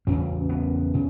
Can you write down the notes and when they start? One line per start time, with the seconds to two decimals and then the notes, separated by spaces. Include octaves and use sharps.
0.07 E2 C#3 C#4
0.49 B3
0.94 C#3